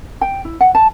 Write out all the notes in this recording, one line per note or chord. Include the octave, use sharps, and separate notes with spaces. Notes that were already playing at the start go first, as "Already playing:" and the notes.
G5
E4
F#5
A5